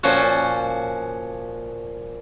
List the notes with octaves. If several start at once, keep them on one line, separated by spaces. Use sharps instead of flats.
A#2 F3 C#4 F#4